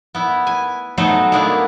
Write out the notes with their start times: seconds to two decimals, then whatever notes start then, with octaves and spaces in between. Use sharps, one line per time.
0.15 B3 E4
0.47 G#5
0.98 F#3 A3 B3 D#4 C5
1.32 G#3 A#3 B3 D4 E4